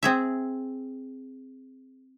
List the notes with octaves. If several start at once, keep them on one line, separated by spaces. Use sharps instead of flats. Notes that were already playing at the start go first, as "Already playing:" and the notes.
C4 G#4 E5